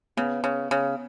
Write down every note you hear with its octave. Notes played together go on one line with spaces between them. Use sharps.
C#3 B3
C#3
C#3